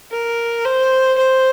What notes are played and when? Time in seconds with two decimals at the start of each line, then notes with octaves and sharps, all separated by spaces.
0.12 A#4
0.65 C5
1.18 C5